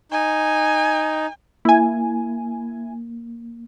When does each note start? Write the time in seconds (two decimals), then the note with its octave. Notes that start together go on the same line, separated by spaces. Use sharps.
0.12 D#4 G#5
1.65 A#3 E4 G#5